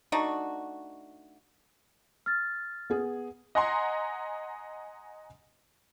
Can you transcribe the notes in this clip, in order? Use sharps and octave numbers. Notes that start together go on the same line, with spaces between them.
A3 D4 D#4 F#4
F6 A6
B3 G#4
D#5 F#5 G#5 A#5 C6